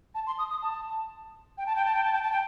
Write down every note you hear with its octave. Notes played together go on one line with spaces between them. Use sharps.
A5
C6
D#6
D#6
A5
G5
A5
G5
A5
G5
A5
G5
A5
G5